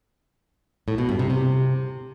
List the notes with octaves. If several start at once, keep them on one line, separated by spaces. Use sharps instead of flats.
A2
B2
G2
C3
C3